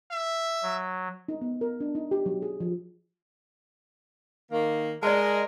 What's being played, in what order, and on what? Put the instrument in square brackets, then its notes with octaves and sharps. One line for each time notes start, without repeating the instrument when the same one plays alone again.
[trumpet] E5
[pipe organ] F#3
[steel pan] D#4
B3
A#4
D4
D#4
G4
F#3
G#4
F3
[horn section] D#3 A#3
[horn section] G#3 [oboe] A#4 [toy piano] D5 A5